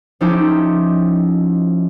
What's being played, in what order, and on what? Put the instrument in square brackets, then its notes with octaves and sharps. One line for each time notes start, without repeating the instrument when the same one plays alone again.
[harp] F3 C#4 D#4 E4 G4